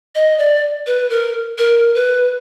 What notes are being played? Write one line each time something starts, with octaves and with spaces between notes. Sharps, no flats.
D#5
D5
B4
A#4
A#4
B4